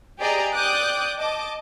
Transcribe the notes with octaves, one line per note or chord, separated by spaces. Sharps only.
G4 G#4 D5 D#5 A#5
D5 G5 D6 D#6 F#6 G6
D#5 A5 D6